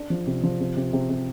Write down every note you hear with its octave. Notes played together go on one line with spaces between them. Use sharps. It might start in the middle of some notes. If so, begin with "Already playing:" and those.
Already playing: D4
F3
C3
F3
C3
C3
C3
C3